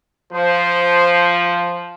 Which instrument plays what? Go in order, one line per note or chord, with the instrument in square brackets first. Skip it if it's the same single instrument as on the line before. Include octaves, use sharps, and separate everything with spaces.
[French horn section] F3 [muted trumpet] C5